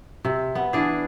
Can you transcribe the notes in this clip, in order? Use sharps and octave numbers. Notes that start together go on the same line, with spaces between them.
C3
B3
E3 D4 G#4